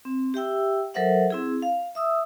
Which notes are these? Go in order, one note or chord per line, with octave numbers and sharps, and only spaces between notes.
C4
G4 E5 G5 E6
F#3 A4 A#4 C5 E5 F#5
C4 E4 G#4
F5
E5 D#6 E6